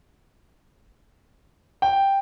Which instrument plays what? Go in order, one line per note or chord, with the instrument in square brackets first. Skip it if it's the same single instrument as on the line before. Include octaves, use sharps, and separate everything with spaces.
[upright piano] G5